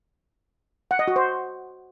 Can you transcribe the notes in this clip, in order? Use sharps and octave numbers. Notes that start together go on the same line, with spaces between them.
F#5
D#5
F#4
C5